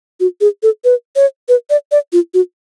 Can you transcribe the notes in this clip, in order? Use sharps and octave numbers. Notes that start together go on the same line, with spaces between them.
F#4
G#4
A4
B4
C#5
B4
D5
D5
F4
F#4